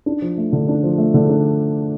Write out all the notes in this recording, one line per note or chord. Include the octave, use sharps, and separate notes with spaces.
D4
F3
A3
D3
D4
F3
A3
D3
D4